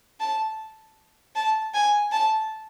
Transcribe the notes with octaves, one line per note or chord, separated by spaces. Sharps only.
A5
A5
G#5
A5